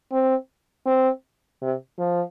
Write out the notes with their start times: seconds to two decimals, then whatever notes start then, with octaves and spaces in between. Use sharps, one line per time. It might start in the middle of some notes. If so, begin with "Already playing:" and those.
0.12 C4
0.86 C4
1.62 C3
1.99 F3